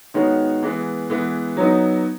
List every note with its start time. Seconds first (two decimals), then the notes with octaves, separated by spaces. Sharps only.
0.14 D#3 G#3 B3 F#4 C#5
0.63 E3 G#3 B3
1.10 E3 G#3 B3
1.57 F#3 B3 D#4